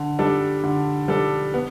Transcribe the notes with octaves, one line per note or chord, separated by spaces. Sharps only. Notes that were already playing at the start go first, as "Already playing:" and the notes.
Already playing: D3
G3 D4 A4
D3
G3 D4 A4
B3